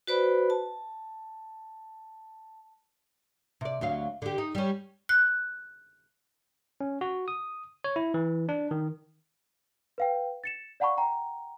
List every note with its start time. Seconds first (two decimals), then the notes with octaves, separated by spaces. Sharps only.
0.07 F#4 B4 C5 D5 B5
0.50 A5
3.61 C3 D5
3.81 D2 F#3 F5
4.22 D3 G4
4.38 D#4
4.55 G3 C#4
5.09 F#6
6.81 C#4
7.01 F#4
7.28 D#6
7.84 C#5
7.96 E4
8.14 E3
8.49 D4
8.71 D#3
9.98 B4 F5 G5
10.44 A6 C#7 E7
10.80 D5 F5 F#5 A5 B5 C#6
10.97 F#5 G5 A#5